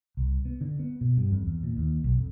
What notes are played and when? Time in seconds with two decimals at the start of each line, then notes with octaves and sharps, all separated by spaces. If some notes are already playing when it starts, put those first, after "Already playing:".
0.17 C2
0.45 B3
0.61 D3
0.79 B3
1.01 B2
1.17 G2
1.31 F2
1.47 E2
1.63 A#2
1.77 D#2
2.04 B1
2.17 F2